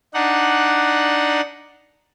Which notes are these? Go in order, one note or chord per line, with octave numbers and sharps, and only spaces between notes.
D4 D#4 F#5